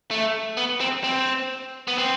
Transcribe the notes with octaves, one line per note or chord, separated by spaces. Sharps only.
A3
B3
C4
C4
B3
C4